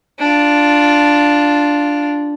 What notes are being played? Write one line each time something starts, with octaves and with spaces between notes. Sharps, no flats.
D4 F4